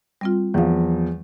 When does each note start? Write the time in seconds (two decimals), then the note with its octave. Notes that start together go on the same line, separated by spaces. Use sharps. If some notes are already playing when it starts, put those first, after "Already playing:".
0.21 G3 C4 F4
0.54 E2 E3 F3 F5